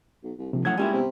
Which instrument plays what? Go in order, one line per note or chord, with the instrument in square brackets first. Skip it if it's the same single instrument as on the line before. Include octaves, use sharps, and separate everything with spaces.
[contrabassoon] B1
C2
[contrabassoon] A#1 [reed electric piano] C3 F3
[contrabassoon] A2 [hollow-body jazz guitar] F3 F#3 F#5 [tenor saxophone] C#4 [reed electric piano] G#6
[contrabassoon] A#2 [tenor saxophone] G3 [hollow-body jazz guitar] G#3 C#4 E4
[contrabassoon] C3 [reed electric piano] B3